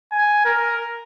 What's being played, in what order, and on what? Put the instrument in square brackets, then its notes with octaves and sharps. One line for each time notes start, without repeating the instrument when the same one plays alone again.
[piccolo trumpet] G#5
A#4